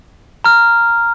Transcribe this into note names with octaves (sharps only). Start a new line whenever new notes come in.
A#5 F6